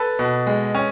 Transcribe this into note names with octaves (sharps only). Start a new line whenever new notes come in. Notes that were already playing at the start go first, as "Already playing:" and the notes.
Already playing: A4 B4
B2
G#3
C#4